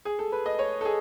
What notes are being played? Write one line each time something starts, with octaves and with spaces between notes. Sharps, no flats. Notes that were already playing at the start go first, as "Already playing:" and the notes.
G#4
A4
B4
D#5
C#5
A4
G#4